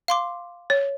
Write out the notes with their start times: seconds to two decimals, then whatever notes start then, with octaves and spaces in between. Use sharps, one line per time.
0.08 F5 C6 D6
0.70 C#5